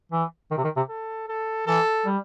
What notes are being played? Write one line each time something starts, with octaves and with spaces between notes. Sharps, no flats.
E3
D#3
C3
D#3
C3
A4
A4
E3 A4
G3